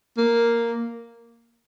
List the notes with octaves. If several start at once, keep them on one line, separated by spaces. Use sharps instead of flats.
A#3